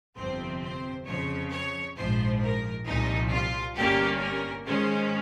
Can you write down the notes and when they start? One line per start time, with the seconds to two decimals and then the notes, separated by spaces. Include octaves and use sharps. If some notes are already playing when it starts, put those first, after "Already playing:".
0.17 G1 F2 C3 F3 C4 C5
0.63 C5
1.07 F2 C#3 F3 C#5
1.51 C#5
1.96 A#1 G#2 F3 C5
2.41 A#4
2.86 C2 A#2 F3 D#4
3.31 F4
3.75 G1 G2 G3 A#3 C#4 G4
4.20 A#4
4.65 G#2 D#3 G#3 C#4 C5